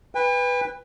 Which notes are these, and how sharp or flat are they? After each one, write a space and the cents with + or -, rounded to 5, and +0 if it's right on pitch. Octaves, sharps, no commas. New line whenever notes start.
B4 +0 G5 +45